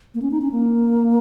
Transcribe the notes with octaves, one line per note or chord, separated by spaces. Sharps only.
A#3
C#4
D#4
C#4
A#3